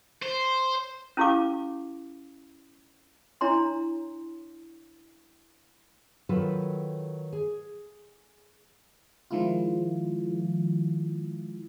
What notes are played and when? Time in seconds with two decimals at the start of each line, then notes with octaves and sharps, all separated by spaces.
0.23 C5
1.17 C#4 E4 G4 F5 D6
3.41 D4 E4 C#5 A#5 C6
6.29 D#3 F#3 F4 A4 B4
7.33 G#4
9.31 D#3 F3 G#3 E4 F4